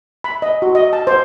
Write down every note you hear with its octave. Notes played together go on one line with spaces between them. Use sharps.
B5
D#5
F#4
D#5
A5
C5